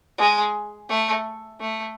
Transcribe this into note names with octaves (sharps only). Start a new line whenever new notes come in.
G#3
A3
A3